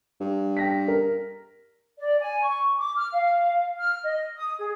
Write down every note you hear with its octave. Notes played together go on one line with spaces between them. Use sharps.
G2
G5 A#6 B6
A#4
D5
G#5
C#6
D6
F6
F5
F6
D#5
D#6
G#4